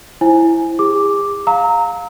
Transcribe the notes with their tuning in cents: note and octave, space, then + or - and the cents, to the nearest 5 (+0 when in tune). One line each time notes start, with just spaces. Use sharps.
E4 +10 C5 +15 G#5 +0
G#4 -45 D6 +0
F5 +20 A#5 -15 E6 -40